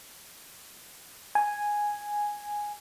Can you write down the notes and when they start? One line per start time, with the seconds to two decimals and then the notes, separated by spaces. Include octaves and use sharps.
1.35 G#5